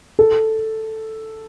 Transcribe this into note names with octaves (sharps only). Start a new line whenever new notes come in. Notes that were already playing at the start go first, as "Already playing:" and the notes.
A4